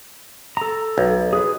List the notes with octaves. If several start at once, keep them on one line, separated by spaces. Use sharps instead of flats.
A4 A#5
B1
G#4 B4